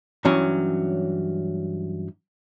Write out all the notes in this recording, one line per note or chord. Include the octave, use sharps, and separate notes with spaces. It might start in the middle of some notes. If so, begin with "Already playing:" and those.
G2 E3 F#3 C#4